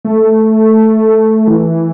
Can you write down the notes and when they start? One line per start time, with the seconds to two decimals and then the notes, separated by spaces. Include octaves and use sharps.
0.05 A3
1.47 E3